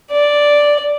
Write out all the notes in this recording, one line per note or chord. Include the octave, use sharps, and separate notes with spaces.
D5